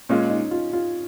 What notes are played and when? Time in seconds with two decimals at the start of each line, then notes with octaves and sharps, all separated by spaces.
0.09 A#2 G#3 C#4 F4
0.30 D#4
0.51 F4
0.73 F4